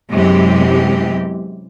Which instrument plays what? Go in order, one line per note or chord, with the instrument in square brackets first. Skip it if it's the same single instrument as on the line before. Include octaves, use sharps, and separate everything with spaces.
[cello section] F#2 C3 E3 G#3 B3 G4